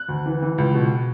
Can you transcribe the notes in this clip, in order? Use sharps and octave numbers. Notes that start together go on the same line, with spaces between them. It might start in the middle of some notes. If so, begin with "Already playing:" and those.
Already playing: F#6
D2
E3
E3
C#2
B2